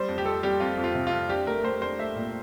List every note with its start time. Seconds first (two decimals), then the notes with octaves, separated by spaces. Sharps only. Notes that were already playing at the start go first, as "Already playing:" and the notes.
Already playing: G3 C5
0.08 F2
0.18 G4
0.25 F2 A4
0.43 G3 G4
0.60 F2 F4
0.78 F2
0.84 F4
0.95 C3
1.07 F4
1.12 F2
1.29 D4 G4
1.46 A3 A#4
1.64 A3 C5
1.82 D4 C5
1.99 A3 E5
2.16 A#2